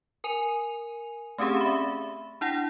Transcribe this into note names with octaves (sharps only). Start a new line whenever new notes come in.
A#4 G#5 D#7 F7
A3 C4 C#4 G4 G#4
E5 B5
D4 E4 F#5 A#6